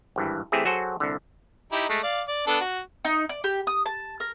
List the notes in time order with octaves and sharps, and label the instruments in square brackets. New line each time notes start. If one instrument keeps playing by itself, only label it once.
[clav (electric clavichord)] G#1 G2 E3
E3 A3 C4 E4 G4 G#4
F#3 F#4 G#4 A4 C5
C2 D3
[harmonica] D#4 E4 G4
G#3 A3
D5 F5
D5
B3 D4 A4
F#4
[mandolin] D#4
D5
G4
D#6
A5
A#4